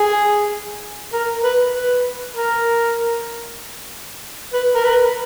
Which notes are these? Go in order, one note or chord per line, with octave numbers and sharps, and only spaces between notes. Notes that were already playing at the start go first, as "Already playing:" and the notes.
Already playing: G#4
A#4
B4
B4
A#4
B4
A#4
B4